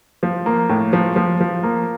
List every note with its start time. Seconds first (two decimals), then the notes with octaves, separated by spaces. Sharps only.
0.23 F3
0.46 A#3
0.69 A2
0.93 F3
1.16 F3
1.40 F3
1.63 A#3